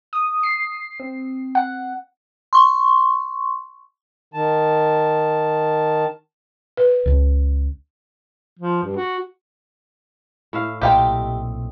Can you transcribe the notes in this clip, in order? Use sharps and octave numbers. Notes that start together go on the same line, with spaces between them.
D#6
C7
C4
F#5
C6 C#6
D#3 A5
B4
C#2 C#3
F3
G2
F#4
A2 E5 F5
B1 A#2 C4 D#4 G4 E5 F5 G5